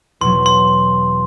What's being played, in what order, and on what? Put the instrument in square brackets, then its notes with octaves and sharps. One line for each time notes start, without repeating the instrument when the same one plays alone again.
[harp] E2 B2 F#3 [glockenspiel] C6
[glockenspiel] C6